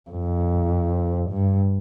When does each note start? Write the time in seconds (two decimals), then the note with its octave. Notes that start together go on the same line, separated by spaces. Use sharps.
0.10 F2
1.30 G2